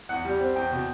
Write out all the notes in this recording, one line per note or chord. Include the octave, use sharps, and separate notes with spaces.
E2 F#5
G3
C4
E2 G5
B2